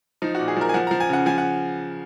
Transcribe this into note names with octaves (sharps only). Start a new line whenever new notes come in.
F3 D#4
F#4
A#2
G#4
F3 A#4
G#5
F3 F#5
F3 A#5
G#5
C#3 F#5
F3 G#5
F#5